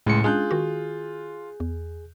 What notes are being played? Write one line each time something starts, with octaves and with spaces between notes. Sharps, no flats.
C#2 A2 G#3 C6 C#7
G#3 C#4 D4 F4 G#4 F#6 G6
D#3 F#4
E2